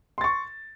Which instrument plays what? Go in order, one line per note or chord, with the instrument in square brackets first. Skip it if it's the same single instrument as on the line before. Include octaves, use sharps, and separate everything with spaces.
[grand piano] C6
A6
C#6